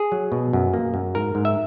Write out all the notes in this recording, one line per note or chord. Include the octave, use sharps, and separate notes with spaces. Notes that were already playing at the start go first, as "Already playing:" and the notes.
Already playing: G#4
F#3
B2
F#2
A#3
F#2
G#2 A#4
G#2
E5